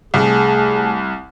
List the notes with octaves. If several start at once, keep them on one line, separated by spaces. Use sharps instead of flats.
C2 A3 G#4 G#5 A5